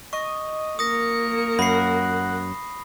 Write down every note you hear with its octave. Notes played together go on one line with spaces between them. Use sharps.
D#5 C#6
A#3 A#4 D#6 A#6 C#7
F#2 F#5 B5 C7